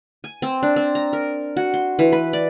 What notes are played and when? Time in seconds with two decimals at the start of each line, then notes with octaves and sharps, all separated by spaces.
0.24 G#5
0.42 C4
0.63 D4
0.76 C4
0.95 A#5
1.13 A#4
1.57 F#4
1.74 C6
1.99 E3
2.12 B4
2.33 D5